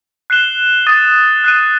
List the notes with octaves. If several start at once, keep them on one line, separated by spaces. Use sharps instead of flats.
F#6 C7 E7 G7
D#6 A6 D#7 G7
F#6 C7 D#7